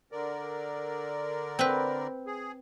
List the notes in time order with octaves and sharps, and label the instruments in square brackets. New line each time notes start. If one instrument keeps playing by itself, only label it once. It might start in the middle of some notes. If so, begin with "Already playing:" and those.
[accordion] D3 A#4 D5
[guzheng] C4 B4
[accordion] G#4